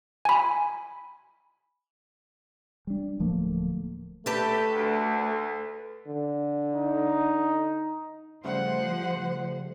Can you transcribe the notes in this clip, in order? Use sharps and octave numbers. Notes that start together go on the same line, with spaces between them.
G#5 B5
G3 D4
D1 F3 A3 A#3
A3 G4 A4 B4
D2
D3
D#4
C#3 F3 G3 A3 C5 F#5